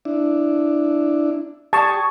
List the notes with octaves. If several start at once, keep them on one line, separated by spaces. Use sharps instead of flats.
D4 E4
G4 A5 C#6 D#6 G#6